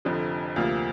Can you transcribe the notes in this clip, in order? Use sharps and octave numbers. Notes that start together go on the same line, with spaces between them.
F1 F2 D3 F3
D2 C3 F3 A#3 F4